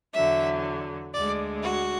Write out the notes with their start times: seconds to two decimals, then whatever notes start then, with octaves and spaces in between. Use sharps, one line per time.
0.15 E2 D3 F#3 E5
1.14 D2 D3 G#3 D5
1.64 F#4